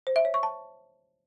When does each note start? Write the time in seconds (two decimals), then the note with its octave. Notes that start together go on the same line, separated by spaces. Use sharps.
0.07 C5
0.16 E5
0.25 C#5
0.34 C#6
0.43 A5